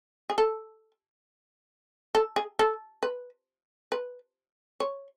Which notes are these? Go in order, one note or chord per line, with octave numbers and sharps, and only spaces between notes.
G#4
A4
A4
G#4
A4
B4
B4
C#5